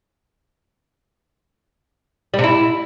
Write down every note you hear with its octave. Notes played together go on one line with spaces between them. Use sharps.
G3
C3
E4